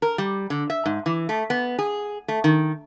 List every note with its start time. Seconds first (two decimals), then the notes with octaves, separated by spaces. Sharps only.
0.02 A#4
0.18 G3
0.50 D3
0.70 E5
0.86 G#2
1.06 E3
1.29 A3
1.50 B3
1.79 G#4
2.28 A3
2.44 D#3